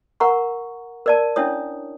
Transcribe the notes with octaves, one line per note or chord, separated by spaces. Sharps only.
A#4 F#5 A#5 C#6
A#4 D5 A5
C#4 D4 E4 C#5 D#6